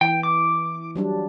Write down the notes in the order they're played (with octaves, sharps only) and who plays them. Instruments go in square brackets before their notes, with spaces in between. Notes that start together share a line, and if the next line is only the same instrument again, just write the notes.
[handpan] E3 [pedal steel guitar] G5
[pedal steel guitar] D6
[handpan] F#3 G3 D4